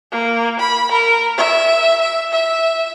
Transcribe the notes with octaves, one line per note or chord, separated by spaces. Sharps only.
A#3
B5
A#4
E5
E5
E5